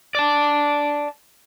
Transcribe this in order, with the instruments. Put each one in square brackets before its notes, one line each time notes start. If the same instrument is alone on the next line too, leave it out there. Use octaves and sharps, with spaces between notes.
[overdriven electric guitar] D5 A5